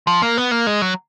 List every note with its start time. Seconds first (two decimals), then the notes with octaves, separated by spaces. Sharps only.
0.07 F3
0.22 A#3
0.37 B3
0.51 A#3
0.67 G#3
0.82 F#3